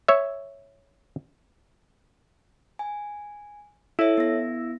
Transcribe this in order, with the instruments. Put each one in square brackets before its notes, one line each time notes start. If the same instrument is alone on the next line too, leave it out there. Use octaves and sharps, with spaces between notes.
[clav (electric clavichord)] C#5 E5
[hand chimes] G#5
[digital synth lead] E4 [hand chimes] A4 C#5 E5
[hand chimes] B3 A#6